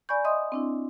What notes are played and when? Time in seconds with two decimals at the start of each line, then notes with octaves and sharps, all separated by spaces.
0.09 D5 G#5 B5 C#6 G6
0.25 D#5 E5 F#5 C6 D#6
0.52 C4 D4 E4